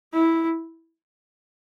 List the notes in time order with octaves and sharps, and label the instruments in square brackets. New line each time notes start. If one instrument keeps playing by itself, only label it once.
[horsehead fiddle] E4